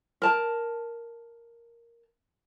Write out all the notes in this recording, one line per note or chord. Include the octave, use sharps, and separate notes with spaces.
A#4 A5